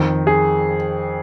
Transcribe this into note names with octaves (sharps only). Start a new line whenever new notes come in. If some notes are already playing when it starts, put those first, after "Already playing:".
Already playing: F2 D#3
G#4